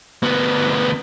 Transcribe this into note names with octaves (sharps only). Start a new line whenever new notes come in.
D2 B3